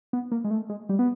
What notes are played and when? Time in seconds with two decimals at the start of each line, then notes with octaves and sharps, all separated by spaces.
0.13 B3
0.32 A#3
0.44 G#3
0.51 A3
0.70 G#3
0.89 G3
0.99 B3